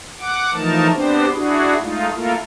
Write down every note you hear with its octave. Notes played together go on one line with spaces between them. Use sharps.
F#5 D6
E3 F3 A3 D#4 A#4 A5
B3 C4 D4 G4 C5
D4 E4 F#4 G#4
G#3 A3 D#4 F4
A3 A#3 E4 F4 A4 A#4